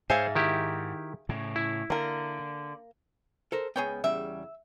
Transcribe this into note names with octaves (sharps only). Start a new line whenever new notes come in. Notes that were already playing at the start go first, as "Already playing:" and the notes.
G#2 G#4 C5 C#5 E5 F5
D#3 E4 G4
A2 C#3
E4
D3 A#3 A#4
A4 A#4 C5
C#2 B3 G#4 C#5 G5
E2 C#3 G3 E5